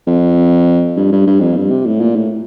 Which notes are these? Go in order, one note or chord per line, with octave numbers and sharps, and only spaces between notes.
F2
G2
G2
G2
F2
G2
C3
A2
A#2
A2